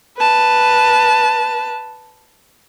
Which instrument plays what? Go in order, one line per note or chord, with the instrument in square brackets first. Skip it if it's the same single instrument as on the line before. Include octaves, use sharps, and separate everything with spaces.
[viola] B4 A5